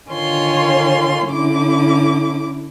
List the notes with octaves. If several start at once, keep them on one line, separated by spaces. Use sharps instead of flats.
D3 D#3 F4 C#5 G#5 C6
D3 C#4 E4 D6